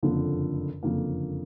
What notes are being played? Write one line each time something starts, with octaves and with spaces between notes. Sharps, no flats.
F#1 F2 D3 F3 A#3
F#1 F2 D3 F3 A#3